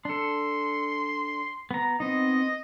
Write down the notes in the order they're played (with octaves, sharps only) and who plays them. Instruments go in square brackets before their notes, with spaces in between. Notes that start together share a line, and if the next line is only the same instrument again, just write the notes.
[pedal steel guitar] D4 A4 [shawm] C6
[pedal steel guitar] B3 A#5
[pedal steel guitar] B3 C4 D#4 [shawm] D#5